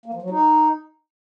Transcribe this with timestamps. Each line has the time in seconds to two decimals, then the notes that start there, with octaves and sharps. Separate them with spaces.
0.06 A#3
0.14 F3
0.22 F#3
0.30 D#4